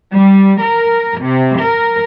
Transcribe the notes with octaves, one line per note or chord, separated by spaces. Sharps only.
G3
A#4
C3
A#4